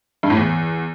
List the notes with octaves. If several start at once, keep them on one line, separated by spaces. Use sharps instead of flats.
G2
A2
E2